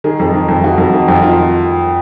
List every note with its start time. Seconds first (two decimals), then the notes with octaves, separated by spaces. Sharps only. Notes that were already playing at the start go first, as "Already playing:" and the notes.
0.04 D#3 G#4
0.20 F2
0.34 D#3
0.48 F2
0.63 D#3 F#4
0.78 F2
0.92 D#3
1.08 F2
1.22 D#3 F4